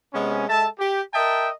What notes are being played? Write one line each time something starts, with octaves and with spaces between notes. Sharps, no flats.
C3 G#3 B3 C#4
G#3 A4 E5 A5
G4
A#4 D#5 E5 G5 A5